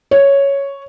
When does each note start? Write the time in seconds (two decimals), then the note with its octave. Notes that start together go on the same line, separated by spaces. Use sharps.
0.11 C#5